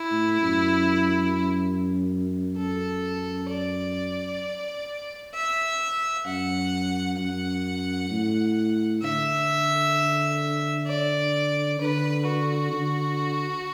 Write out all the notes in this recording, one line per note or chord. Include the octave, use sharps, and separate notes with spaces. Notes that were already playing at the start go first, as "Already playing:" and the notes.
Already playing: E4
A2
F#2
F#2 A4
D5
E5
F#2 F#5
F#2 F#5
A2
D3 E5
D5
D3 B4
F#4
D3